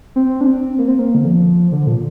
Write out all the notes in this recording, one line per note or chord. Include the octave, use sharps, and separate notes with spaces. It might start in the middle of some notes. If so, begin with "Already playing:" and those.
C4
D4
C4
A#3
C4
A#3
D3
F3
D3
A#2